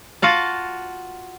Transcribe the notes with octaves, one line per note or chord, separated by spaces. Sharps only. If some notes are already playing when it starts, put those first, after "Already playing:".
F4 F#4 F5 A5